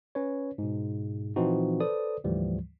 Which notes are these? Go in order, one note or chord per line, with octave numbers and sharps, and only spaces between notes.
C#4 B4 C#5
G#2 B2
A#2 E3 F3 C4 D#4 F#4
A4 B4 C5 D5 D#6
D2 G#2 E3 F3 G3